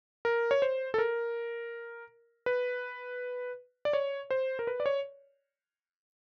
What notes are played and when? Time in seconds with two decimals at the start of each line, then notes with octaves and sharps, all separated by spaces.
0.25 A#4
0.51 C#5
0.62 C5
0.94 A4
0.98 A#4
2.46 B4
3.85 D5
3.93 C#5
4.31 C5
4.59 A#4
4.67 B4
4.80 D5
4.86 C#5